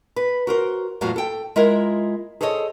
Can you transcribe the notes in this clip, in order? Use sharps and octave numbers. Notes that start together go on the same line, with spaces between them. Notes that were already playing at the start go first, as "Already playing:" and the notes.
B4
F#4 A#4 C5
E2 A2 F#3 F4 F#4 F5
A4 G5
G#3 E4 F4 A#4
G#4 A4 C5 C#5 D#5